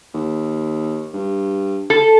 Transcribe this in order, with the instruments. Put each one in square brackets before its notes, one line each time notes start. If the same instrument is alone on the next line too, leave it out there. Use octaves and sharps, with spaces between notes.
[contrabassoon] D#2
G2
[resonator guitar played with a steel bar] A4